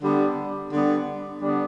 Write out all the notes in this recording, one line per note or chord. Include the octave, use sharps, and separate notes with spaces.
D3 G3 B3 D4
D3 G3 B3 D4
D3 G3 B3 D4